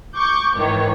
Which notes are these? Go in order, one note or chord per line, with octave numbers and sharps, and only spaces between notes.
C#6 D6 G6
G#2 D#3 E3 C#5